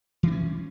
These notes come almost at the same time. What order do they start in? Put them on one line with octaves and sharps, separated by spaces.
E3 D4 C#4